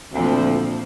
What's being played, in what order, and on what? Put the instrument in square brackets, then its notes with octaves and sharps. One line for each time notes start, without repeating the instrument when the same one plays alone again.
[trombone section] D2 [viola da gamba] A#2 F3 C4